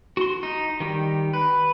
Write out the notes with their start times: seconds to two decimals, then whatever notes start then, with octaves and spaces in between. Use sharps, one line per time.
0.17 F#4 C6
0.43 D#4
0.80 D#3 G3
1.33 B4